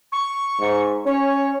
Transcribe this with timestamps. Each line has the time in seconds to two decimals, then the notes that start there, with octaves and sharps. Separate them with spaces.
0.12 C#6
0.60 G#2
1.06 C#4 C#5